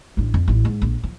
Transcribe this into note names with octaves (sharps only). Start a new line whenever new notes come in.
A1 D4
F2
A1 E4
G#2
A#1
F3